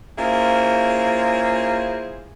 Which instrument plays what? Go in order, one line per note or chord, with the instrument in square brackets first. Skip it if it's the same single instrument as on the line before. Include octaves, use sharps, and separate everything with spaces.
[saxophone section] A#3 C#4 E4 F4 G#4 C5